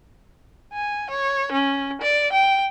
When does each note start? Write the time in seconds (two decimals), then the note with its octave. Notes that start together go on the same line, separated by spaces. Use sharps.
0.73 G#5
1.10 C#5
1.52 C#4
2.01 D5
2.32 G5